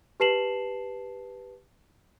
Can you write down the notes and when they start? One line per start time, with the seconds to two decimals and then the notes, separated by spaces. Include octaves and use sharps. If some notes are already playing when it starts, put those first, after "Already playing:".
0.20 G4 B4 A5 C7 E7 F#7